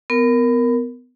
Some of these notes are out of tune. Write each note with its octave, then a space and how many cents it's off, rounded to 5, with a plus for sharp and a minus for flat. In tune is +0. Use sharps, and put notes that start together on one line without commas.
B3 +25 A#4 +0